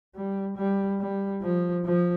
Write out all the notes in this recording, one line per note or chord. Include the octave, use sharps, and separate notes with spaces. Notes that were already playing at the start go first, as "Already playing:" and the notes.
G3
G3
G3
F3
F3